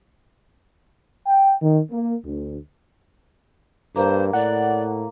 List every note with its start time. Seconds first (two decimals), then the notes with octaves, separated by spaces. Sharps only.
1.25 G5
1.61 D#3
1.90 A#3
2.24 D2
3.96 G2 A#3 C5
4.33 A2 D5 F#5